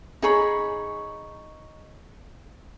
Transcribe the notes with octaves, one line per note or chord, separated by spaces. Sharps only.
D#4 G#4 C#5 B5